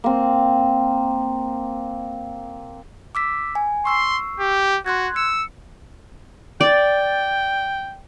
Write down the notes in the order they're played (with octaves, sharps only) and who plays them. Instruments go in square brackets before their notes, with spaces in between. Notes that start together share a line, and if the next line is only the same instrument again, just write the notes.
[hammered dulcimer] A#3 C4
[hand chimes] D6 E6 B6
G#5
[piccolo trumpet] C6 [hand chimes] C#6 E6 C7
[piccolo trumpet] G4
[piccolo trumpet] F#4 [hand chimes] C6 F#6 G#6
[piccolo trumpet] E6 [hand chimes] C#7
[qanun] D5 [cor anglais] G5